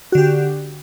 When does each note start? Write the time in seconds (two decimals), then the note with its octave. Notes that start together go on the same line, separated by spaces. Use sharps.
0.12 F#4
0.15 D3
0.18 G4